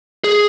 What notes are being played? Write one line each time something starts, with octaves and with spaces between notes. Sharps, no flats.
G#4